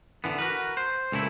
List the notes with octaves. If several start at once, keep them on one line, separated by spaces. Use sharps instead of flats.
D3 E3 B3
F#4 A#4 B4
C5
C#2 A#2 A3 E4